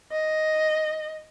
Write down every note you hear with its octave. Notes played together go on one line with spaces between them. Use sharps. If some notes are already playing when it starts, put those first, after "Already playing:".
D#5